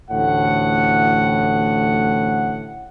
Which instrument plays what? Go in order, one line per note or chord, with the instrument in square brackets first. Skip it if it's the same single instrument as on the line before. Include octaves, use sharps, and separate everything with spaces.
[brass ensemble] A1 D2 A2 F#5